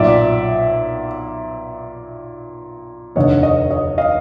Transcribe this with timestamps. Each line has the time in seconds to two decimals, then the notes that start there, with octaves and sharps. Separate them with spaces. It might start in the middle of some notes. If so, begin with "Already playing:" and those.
Already playing: B1 A#2 D5 E5
3.16 F1 D#2 D3 C#5 D#5
3.43 C#5 D#5
3.70 C#5 D#5
3.98 D#5 F5